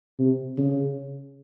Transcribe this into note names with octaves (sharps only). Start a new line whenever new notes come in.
C3
C#3